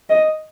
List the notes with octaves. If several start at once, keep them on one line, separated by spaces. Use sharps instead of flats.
D#5